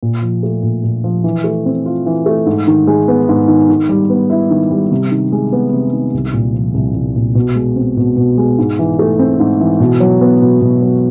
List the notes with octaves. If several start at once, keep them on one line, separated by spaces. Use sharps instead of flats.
A#2
F3
A3
A#2
A#2
F3
E3
A3
C4
F4
E3
A3
G#2
D#3
G#3
B3
G#2
D#3
D#3
G3
B3
E4
D#3
G3
C3
D#3
G#3
B3
C3
D#3
C2
A#2
F3
C2
C2
A#2
B2
G#3
C4
B2
B2
G#3
G#2
E3
A3
C4
G#2
E3
B2
F#3
B3
B2
B2
F#3